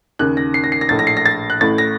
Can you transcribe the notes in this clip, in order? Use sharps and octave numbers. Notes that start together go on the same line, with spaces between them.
D#2 C#3 F#6
A#6
C7
A#6
C7
A#6
A#1 A2 A6
A#6
C7
A#6
A6
F#6
A1 A2 A6
A#6